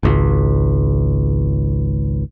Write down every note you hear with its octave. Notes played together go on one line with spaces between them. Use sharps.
G#1 C#2